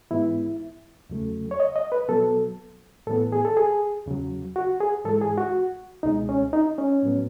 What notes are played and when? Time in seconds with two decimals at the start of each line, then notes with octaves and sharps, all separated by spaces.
0.11 G#2 E3 G#3 B3 E4
1.10 E2 C#3 F#3 A3
1.51 C#5
1.60 D#5
1.76 D#5
1.92 B4
2.08 B2 F#3 B3 A4
3.07 A2 E3 B3 A4
3.32 G#4
3.45 A4
3.57 G#4
4.06 E2 C#3 F#3
4.56 F#4
4.81 G#4
5.05 G#2 E3 G#3 A4
5.22 G#4
5.38 F#4
6.03 C#2 B2 G#3 D#4
6.29 C#4
6.53 D#4
6.78 C#4
7.03 A2 F#3 B3